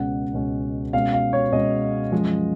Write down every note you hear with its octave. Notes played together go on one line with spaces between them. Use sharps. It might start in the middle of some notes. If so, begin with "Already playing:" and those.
Already playing: C#2 B2 G#3 C#4 F#5
C#2 B2 G#3 C#4
B2 G#3 C#4 F5
F5
C#5
B2 G#3 C#4 D#5
F#2 F3 G#3